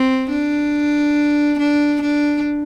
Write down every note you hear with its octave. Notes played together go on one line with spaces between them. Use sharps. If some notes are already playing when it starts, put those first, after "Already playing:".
Already playing: C4
D4
D4
D4